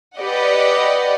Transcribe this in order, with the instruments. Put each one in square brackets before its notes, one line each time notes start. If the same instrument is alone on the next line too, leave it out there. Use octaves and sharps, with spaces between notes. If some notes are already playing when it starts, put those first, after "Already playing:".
[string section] G4 B4 D5 D#5 F#5